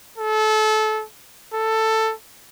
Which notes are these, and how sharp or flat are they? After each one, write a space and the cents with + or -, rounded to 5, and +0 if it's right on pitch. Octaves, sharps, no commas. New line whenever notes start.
A4 -25
A4 +10